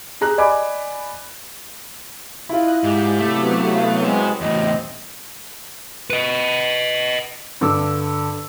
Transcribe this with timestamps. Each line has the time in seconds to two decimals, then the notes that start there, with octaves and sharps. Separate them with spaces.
0.21 G4 G#4 A#5 F#6
0.38 D5 D#5 G#5 B5 D6
2.49 E4 F4 D#5 F#6
2.84 G#2 G4 G6
3.19 C3 F#3 A3 B3
3.73 F5
4.04 G#3 G4 C5
4.41 E2 A2 C3 C4 D#5
6.10 B4 D#5
7.61 G2 D3 D6 E6